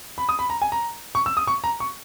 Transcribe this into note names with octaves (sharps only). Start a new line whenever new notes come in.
B5
D#6
B5
A#5
G#5
A#5
C#6
E6
D#6
C#6
A#5
C#6